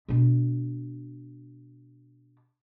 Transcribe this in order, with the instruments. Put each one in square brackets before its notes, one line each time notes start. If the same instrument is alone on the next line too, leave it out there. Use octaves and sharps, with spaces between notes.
[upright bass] B2 D4